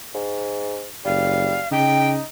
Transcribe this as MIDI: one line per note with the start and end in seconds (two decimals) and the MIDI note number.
0.14 0.86 44
1.05 1.60 30
1.05 1.63 55
1.05 1.68 77
1.71 2.18 49
1.71 2.23 63
1.71 2.09 79